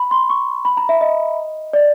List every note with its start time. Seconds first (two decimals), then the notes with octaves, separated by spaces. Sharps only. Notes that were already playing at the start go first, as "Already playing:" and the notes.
Already playing: B5
0.11 C6
0.30 C#6
0.65 B5
0.77 A#5
0.89 E5
1.01 D#5
1.73 D5